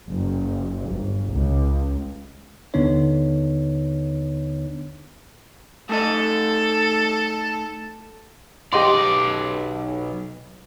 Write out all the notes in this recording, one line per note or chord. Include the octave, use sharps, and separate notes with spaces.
F#1
G1
C#2
D#2 D3 B3 D4 D#4 C#5
A3 D#4 A4 D#5
B1 G4 D5 D#5 C6